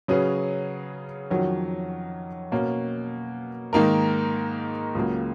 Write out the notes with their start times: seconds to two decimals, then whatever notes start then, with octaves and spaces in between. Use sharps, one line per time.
0.08 C#3 F#3 C#4 G#4 B4
1.31 F2 D#3 F#3 C#4
2.52 B2 A#3 C#4
3.73 G#2 D#3 A#3 D#4 A#4
4.95 C#2 C#3 F#3 A#3